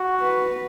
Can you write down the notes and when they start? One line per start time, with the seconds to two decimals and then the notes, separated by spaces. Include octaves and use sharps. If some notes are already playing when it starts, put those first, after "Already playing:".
Already playing: F#4
0.21 B4